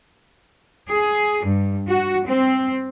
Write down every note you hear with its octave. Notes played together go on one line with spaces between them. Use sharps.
G#4
G2
F#4
C4